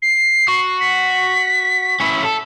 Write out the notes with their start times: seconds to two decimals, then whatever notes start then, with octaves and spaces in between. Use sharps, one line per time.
0.02 C7
0.48 F#4
0.81 B6
2.01 C#4 E4
2.25 A4